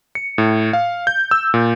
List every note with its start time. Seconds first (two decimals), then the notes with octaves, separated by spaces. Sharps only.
0.15 C#7
0.38 A2
0.73 F5
1.07 G6
1.31 E6
1.54 A#2